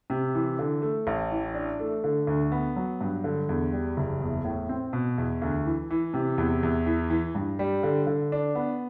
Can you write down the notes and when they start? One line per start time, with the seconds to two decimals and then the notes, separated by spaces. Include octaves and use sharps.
0.10 C3
0.35 E3
0.59 D3
0.82 A3
1.07 A1
1.31 E3
1.54 D4
1.80 A3
2.04 D3
2.27 D2
2.52 B3
2.76 F#3
3.01 G2
3.24 D3
3.49 E2
3.72 G3
3.97 F#1
4.20 E2
4.44 A2
4.69 C4
4.93 B2
5.18 E2
5.42 D2
5.66 E3
5.90 E3
6.14 C3
6.38 E2
6.63 E2
6.86 E3
7.10 E3
7.35 G2
7.59 G3
7.83 D3
8.07 D3
8.32 D4
8.55 B3